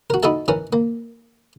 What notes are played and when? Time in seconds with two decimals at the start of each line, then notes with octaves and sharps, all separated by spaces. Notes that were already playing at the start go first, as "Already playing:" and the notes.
0.10 F#4 A#4
0.23 D#4 E4 F#4 A4 E5 A5
0.48 E3 C#4 A#4
0.73 A#3